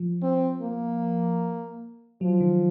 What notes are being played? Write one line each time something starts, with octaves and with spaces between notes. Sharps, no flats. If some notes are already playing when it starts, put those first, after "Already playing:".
Already playing: F3
C4
A#3
F3 F#3
D#3